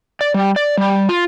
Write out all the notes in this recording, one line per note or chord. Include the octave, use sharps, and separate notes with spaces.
D5
G3
D5
G3
F4